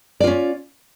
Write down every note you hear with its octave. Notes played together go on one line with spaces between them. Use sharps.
C#4 F4 D5